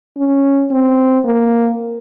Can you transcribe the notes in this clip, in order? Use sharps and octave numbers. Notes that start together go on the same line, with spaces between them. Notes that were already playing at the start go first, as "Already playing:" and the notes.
C#4
C4
A#3